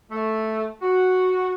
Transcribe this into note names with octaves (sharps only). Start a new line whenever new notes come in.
A3
F#4